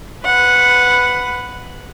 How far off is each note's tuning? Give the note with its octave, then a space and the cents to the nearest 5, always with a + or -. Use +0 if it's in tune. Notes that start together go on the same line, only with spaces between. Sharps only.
B4 +10 F#5 -10